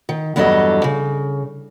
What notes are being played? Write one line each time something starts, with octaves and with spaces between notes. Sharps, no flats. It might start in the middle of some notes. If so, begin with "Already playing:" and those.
D#3
E2 G2 F#3 G3 A4 D#5
C#3